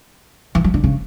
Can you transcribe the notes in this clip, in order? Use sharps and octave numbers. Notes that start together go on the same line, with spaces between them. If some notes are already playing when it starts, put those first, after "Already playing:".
E3
F#3
D3
C#3